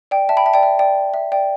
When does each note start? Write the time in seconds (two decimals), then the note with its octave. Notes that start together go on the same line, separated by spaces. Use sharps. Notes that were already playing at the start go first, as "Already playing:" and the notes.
0.11 D5 G5
0.29 E5 A5
0.37 G5 B5
0.46 E5 A5
0.54 D5 G5
0.63 E5
0.79 D5 G5
1.14 E5
1.32 D5 G5